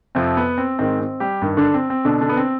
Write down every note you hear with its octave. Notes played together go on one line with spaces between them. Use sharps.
F2 C3 F3 C4
B3
C4
G#2 D#3 C4
C4
G3 G4
G2 D#3
D3 D4
C4
C4
B2 D3 D4
D3 D4
B3
C4